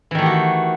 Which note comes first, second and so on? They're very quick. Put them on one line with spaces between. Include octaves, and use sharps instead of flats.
E3 D#3 A3 G4 F#4